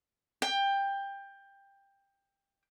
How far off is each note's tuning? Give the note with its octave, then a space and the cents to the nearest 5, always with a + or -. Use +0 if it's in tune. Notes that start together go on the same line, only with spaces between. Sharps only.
G5 +15